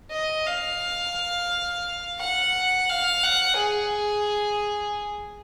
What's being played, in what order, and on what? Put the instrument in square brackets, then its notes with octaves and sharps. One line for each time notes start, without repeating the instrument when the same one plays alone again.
[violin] D#5
F5
F#5
F5
F#5
G#4